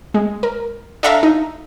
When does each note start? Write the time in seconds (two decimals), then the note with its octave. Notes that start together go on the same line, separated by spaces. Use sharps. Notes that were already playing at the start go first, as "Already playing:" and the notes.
0.14 G#3
0.43 A#4
1.03 D4 A4 E5 F5 A#5
1.23 D#4